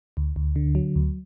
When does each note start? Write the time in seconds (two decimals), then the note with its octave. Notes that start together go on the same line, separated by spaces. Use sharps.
0.17 D2
0.36 D2
0.56 D3
0.75 F#3
0.96 D2